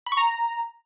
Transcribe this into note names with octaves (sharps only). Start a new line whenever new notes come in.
B5
C#6
A#5